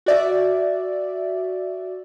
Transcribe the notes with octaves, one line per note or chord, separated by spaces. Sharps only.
F#4 D5 E5